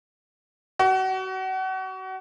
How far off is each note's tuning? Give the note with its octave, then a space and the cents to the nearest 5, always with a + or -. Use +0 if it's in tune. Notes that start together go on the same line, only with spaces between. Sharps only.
F#4 +30